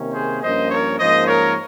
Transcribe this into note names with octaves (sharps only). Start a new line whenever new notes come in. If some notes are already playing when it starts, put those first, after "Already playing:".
Already playing: C3 D#3 A#3 C#4
G#4 C5
G2 F3 A#3 C#4 C5 D#5
A#4 C#5
G#2 F3 A#3 C#4 C5 D#5
A#4 C#5